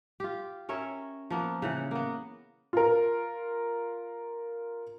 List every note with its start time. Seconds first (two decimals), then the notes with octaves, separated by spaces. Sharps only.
0.20 F4 G4
0.69 C#4 A#4 C#5 E5
1.30 F3 A#3 B3
1.62 C#3 E3 F#5
1.91 A#3 B3
2.73 F4 A#4